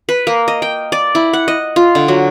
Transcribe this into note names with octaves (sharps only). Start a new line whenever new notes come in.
B4
A#3
D#5
G5
D5
E4
F#5
D#5
F4
D3
F#3